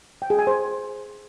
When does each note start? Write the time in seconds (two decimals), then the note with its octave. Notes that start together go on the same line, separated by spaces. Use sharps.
0.22 G5
0.30 G#4
0.39 G#5
0.47 C5